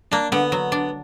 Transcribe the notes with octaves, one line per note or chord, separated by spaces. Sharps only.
A#3 D4
D3 B3
F#3
D4